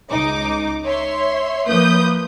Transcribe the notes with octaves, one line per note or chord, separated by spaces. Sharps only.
C#2 D#4 D6
C#5 E5 C6
F3 A#3 B4 D#6 G6